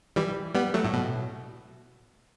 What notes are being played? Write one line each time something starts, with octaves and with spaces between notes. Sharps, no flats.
E3 G3
G3 B3
F#3 A3
A2
B2